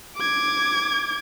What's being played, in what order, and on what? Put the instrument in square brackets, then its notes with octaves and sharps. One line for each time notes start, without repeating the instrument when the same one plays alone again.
[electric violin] D6 G#6